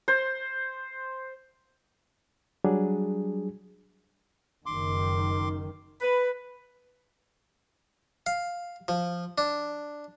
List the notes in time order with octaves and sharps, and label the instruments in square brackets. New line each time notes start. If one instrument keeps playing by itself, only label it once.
[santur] C5
[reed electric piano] F#3 G3 D4 G#4
[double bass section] F#1 F#2 D#3 [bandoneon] C6 D6
[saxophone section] B4
[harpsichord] F5
F3
D4